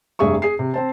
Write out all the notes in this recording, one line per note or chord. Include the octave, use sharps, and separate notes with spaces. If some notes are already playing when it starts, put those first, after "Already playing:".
F1 G2 G#4 E5 C#6
G#4 C7
C3
C4 C5 A5